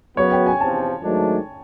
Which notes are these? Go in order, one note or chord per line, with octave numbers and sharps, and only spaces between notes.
F#2 C#3 F#3 B3 C#5
G5
G#5
E2 C3 F3 A5
G#2 D#3 F#3 A3 D4